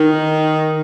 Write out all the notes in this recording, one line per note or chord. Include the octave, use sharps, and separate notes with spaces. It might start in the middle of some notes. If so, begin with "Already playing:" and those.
Already playing: D#3